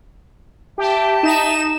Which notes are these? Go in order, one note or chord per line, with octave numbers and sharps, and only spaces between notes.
G4 E5 G5 A5
D#4 E7